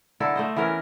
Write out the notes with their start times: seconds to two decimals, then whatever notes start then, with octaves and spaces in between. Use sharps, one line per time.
0.20 D3 E4 A4 A#4
0.36 A3 C5 D#5
0.56 E3 B3 C#4 A#4